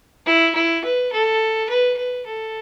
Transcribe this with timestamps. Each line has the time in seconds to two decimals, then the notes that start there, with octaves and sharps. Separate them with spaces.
0.26 E4
0.55 E4
0.84 B4
1.12 A4
1.69 B4
1.97 B4
2.26 A4